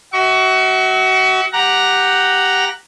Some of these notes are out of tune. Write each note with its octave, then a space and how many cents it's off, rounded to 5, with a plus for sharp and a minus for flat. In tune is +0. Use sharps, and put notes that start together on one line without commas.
F#4 +25 E5 -35 C#6 +25
G4 +0 F#5 +0 A#5 +0